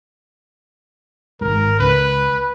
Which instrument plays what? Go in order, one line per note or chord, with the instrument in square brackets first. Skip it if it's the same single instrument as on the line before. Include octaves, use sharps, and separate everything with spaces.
[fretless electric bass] G#1 G#2 [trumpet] A#4
[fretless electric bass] C#2 [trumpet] B4